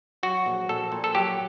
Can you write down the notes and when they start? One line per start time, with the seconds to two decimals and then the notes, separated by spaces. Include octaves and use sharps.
0.23 F#3 F#4
0.46 A#1
0.69 A#1 A4
0.92 A#2
1.04 A4
1.15 F#3 G4